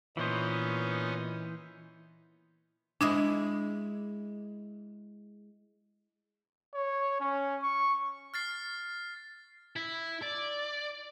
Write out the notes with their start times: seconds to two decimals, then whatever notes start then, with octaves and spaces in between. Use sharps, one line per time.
0.17 A#2 E3 B3 C#4 D#4 C5
3.01 G#3 D4 E4 G#4
6.74 C#5
7.20 C#4
7.63 C#6
8.34 F6 A6 C7
9.76 E4
10.22 D5